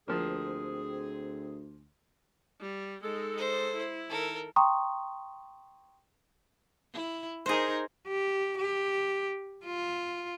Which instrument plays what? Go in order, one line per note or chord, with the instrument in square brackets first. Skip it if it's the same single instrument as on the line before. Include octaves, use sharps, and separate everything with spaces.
[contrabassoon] D2 [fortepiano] F3 A#3 [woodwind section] C4 G#4
[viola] G3
[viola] G#3 D#4 [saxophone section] A4
[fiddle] C5
[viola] E4
[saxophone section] D#3 [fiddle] A4 A#4
[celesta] G5 A#5 C6 C#6 D#6
[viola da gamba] E4
[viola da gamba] D#4 A#4 [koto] G#4 C5
[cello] G4
G4
F4